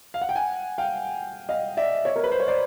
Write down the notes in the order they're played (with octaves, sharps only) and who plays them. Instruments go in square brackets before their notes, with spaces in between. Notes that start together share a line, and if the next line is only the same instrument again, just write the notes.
[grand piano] F5
F#5
G5
F#5 G#5
F5 G5
D#5 F5
D5 E5
C#5 D#5
A#4
B4
C5
C#5
C5 D5